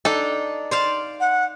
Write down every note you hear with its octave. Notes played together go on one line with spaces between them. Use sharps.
D4 D#4 A4 G5
C5 D5 F5
F#5